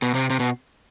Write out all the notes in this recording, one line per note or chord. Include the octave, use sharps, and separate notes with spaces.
B2
C3
C3
B2